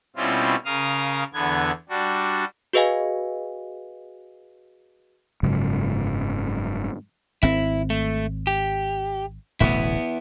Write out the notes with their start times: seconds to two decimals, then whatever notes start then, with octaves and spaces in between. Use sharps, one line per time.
0.16 B2 G3 C4 C#4 E4 F4
0.65 C#3 A#4 F5 D#6 F6
1.34 E2 D3 B3 G#6
1.89 G3 D4 F#4
2.73 F#4 G#4 B4 D#5 F5 G#5
5.43 F#1 G#2 C#3 F#3
7.43 G#1 C4 E4
7.90 A3
8.47 G4
9.60 D1 A1 B2 B3 E4